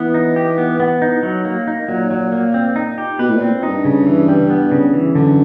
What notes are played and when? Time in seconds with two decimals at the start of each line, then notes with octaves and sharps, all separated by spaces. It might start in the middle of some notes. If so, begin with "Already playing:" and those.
Already playing: E3 B3
0.14 D#4
0.36 G4
0.58 B3
0.80 B3
1.02 D#4
1.23 F#3
1.45 A#3
1.67 D#4
1.88 A#2 F#3
2.11 F#3
2.32 A#3
2.54 C4
2.76 D#4
2.98 G4
3.19 B2 B4
3.30 A2
3.36 A#2 C4
3.63 D#4
3.68 G2
3.85 C#3
4.07 E3
4.28 G3
4.50 B3
4.72 C#3
4.94 E3
5.15 F#2 D3